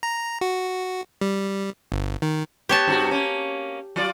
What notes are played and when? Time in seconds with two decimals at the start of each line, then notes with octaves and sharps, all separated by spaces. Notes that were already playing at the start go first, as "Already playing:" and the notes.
0.03 A#5
0.41 F#4
1.21 G3
1.92 G1
2.22 D#3
2.69 B3 G4 C#5 A5
2.87 G2 C4 F#4
3.11 A#3 C#4
3.96 F#3 F4 D5